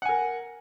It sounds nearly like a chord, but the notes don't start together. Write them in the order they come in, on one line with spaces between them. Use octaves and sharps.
F#5 G#5 A#4